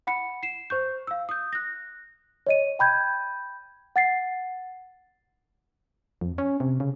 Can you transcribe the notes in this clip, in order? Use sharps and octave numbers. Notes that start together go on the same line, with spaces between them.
F#5 B5 C#7
C7 E7
C5 C#6 G6
F5 E6
D#6 G6
F#6 A#6
C#5 D#5 D#7
G5 B5 G6 G#6
F#5 A6 C7
F2
C#4
C3
C#3